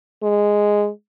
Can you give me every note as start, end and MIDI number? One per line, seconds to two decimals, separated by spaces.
0.23 0.90 56